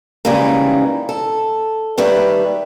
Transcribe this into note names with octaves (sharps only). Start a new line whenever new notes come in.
C#3 E3 G3 G#3 A#3 D#4
A4
D#3 G3 A3 B4